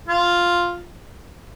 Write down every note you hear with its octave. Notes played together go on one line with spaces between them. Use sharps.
F4